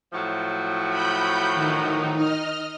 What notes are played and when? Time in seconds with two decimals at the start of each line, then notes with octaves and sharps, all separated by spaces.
0.12 A2 F3 F#3
0.89 B5 G6
1.54 D#3 D#4
2.16 D#5 F6